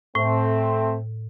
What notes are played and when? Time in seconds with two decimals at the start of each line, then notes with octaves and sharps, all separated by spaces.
0.15 A2 A3 C4